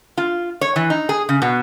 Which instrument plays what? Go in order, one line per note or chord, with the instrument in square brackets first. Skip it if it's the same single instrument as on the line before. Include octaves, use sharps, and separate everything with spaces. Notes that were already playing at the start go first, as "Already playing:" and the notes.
[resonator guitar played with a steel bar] F4
C#5
E3
D#4
G#4
C#3
B2